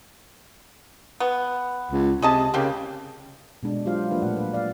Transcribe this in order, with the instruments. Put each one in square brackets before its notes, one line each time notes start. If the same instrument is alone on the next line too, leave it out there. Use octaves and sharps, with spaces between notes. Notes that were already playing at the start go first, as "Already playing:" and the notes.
[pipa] B3
[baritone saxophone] C#2
[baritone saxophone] C3 [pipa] G#4 D#5 A5
[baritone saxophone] C#3 [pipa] A#3 G4
[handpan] B2 G#3 D4
F#3 G#3 F4 G4 C5 F5
F3 A#3 D4 B4 E5
A#2 A3 F#5
B4
D5 F5